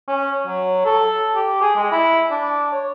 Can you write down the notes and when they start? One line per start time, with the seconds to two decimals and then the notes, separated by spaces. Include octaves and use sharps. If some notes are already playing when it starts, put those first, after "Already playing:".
0.08 C#4
0.47 F#3
0.85 A4
1.35 G4
1.61 G#4
1.76 G#3
1.91 E4
2.31 D4
2.72 C#5